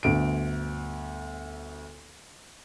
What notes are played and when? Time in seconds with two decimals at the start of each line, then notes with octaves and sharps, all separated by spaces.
0.03 G1 D2 D7